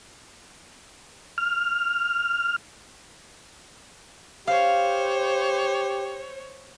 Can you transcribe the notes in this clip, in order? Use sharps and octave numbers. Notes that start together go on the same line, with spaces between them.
F6
G4 C5 C#5 F5